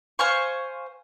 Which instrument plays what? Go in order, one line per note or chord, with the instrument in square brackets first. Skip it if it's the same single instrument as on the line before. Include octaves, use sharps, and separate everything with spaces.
[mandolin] C5 F5 G#5 C#6